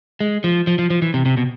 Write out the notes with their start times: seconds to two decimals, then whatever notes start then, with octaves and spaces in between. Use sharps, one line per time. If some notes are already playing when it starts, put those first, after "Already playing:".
0.20 G#3
0.44 F3
0.67 F3
0.79 F3
0.90 F3
1.02 E3
1.14 C3
1.25 C3
1.37 B2